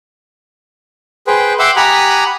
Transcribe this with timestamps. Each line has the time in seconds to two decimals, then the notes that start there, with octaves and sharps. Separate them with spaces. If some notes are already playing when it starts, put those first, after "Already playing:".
1.27 G#4 B4 C5 G5
1.59 E5 F#5 G5 C6 D6 E6
1.76 G4 F#5 G#5 A#5 B5 D#6